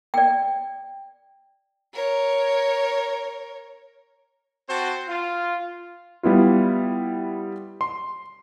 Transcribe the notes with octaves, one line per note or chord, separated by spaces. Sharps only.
D5 G5
A#4 C#5
C4 F#4 C5 A5
F4
G3 B3 E4 F4
C6